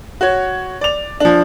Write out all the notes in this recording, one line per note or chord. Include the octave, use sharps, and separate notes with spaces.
F#4 C#5
D5 F7
F3 D4